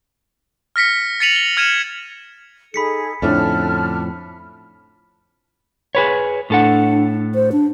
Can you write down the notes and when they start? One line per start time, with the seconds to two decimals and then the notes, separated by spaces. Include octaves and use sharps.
0.76 F6 A#6 B6 C#7
1.20 A6 B6 C#7 D#7 F7 F#7
1.36 G7
1.57 F6 G#6 C#7 D#7 E7 F#7
2.74 D#4 G#4 A4 B5 B6 C#7
3.22 F2 A2 D3 C#4 D4 A5 F6
5.95 G#4 B4 C#5
6.50 A2 D4 A4 F#5
7.35 C5
7.52 D4